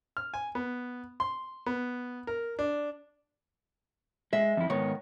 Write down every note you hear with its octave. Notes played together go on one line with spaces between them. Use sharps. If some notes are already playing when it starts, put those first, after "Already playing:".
F6
G#5
B3
C6
B3
A#4
D4
G#3 E5
F2 E4
G#2 D#3 B3 C#5